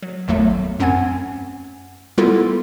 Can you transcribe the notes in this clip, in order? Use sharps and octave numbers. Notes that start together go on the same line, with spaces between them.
F#3
G#1 E2 F#3 A3
F#2 C4 C#4 F#5 G#5 G#6
G3 G#3 B3 E4 F4 A4